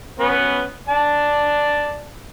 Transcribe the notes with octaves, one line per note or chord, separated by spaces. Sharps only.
B3 C#4 B4
D5 A5